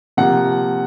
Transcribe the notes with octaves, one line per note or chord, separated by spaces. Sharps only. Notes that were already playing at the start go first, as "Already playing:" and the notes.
C3 F3 A#3 F#5